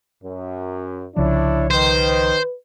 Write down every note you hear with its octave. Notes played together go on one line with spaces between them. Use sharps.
F#2
C2 C#3 F3 D4 E4 C#5
D#3 B4 C5